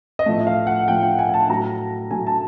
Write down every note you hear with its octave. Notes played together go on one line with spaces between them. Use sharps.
D#5
A2 F3 A3 E5
F5
F#5
A2 F3 A3 G5
G5
G#5
G#5
A5
A2 F#3 A3 A#5
A2 F#3 A3 G#5
A5